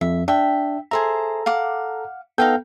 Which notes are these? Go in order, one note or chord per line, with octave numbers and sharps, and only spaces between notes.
F2 E5
D4 E5 G5
G#4 A4 C5 E5 A#5
F5 F#5 D6
B3 D#4 A4 F5 G5 G6